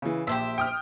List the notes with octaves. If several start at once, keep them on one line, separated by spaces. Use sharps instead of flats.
C#3 E3
A#1 G4 C5 E5
G5 D#6 F6